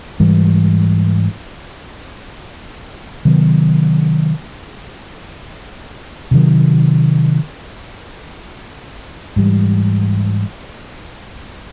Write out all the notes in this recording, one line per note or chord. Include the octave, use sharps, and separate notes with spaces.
G#2 E3 G3
C3 D#3 F#3 B3
C3 D#3 F#3
G#2 E3 G3